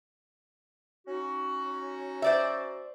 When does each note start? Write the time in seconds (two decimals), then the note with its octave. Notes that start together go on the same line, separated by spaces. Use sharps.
1.08 C#4 D#4 F#4
2.22 C5 D5 E5